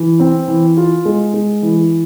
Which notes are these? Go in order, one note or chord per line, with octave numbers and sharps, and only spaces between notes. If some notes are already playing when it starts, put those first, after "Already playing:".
Already playing: E3
C4
E3
F4
G#3
G#3
E3